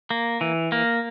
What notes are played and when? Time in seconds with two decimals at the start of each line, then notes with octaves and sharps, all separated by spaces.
0.11 A#3
0.41 E3
0.72 A#3